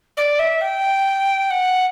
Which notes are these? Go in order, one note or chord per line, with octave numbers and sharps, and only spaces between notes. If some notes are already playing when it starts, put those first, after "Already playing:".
D5
E5
G5
F#5